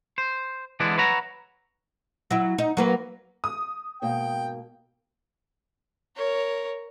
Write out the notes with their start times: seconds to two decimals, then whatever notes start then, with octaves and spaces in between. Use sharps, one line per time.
0.18 C5
0.80 D3 E3 G#3 B3 D4 E4
0.98 B4 C#5 E5 F#5 A#5
2.31 F#3 E4
2.58 D#4
2.77 F#3 A#3 B4
3.44 D#6
4.02 G#2 B2 A#3 G5
6.16 A#4 C#5